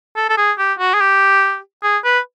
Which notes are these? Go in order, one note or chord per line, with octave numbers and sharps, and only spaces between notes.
A4
A4
G#4
G4
F#4
G#4
G4
G#4
B4